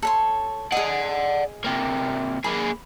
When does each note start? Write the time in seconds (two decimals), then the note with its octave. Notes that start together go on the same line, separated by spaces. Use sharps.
0.02 A4 C#5 C6
0.72 G#4 D5 D#5 F#5
1.64 C3 A#3
2.44 A#3 G#4 B5